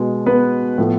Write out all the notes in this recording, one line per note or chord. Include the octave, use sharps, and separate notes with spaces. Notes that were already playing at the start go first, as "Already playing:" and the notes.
Already playing: B2 G#3 B3
B3 B4
A2 F3 B3